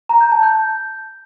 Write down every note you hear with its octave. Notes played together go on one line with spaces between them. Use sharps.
A#5
G6
A5
G6